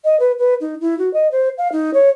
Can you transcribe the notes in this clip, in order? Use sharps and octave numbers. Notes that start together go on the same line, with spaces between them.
D#5
B4
B4
D#4
E4
F#4
D#5
C5
F5
D#4
C#5